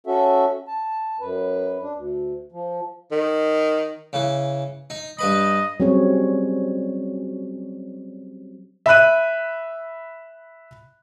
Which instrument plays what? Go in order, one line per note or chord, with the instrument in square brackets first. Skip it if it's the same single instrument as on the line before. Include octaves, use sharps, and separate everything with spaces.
[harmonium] C#4 F#4 A4 E5
A5
F#2 B4
D4
D2
F3
[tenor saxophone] D#3
[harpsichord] C#3 E3
D#4
[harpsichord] G2 B4 B5 [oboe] D#5
[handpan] F#3 G3 C4 C#4 G#4 C#5
[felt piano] E5 B5 F#6 D#7